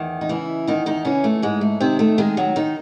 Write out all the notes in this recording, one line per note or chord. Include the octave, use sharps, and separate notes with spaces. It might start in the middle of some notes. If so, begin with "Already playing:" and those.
Already playing: E2 D#3
D#4
C#3 E3 E4
E2 D#3 D#4
D#3 D#4
C#3 E3 C#4
A3
G#2 G#3
A3
C3 D#3 C4
A3
D#3 G#3 G#4
F#3 F#4
D#3 D#4